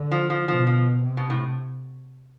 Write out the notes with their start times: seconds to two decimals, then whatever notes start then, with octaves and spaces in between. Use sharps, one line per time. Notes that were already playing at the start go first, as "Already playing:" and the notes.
Already playing: D3
0.11 F3
0.30 F3
0.48 B2 F3
0.67 F3
1.03 C3
1.17 B2
1.30 A2